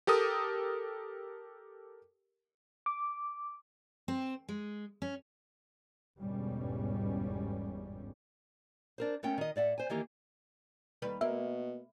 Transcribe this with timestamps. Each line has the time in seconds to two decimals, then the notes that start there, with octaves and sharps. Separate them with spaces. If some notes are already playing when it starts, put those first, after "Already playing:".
0.07 G4 A4 A#4 D#6
2.86 D6
4.08 C4
4.49 G#3
5.02 C#4
6.20 G1 E2 G#2 B2 G3 C#4
8.98 D4 A#4 C5
9.23 A3 B3 C#4 A#4 G5
9.38 D#3 D#5
9.56 A2 D5 E5 F#5
9.78 C5 G#5
9.90 D#3 E3 A#3 G4
11.02 D#2 G3 B4
11.21 B2 A#3 E5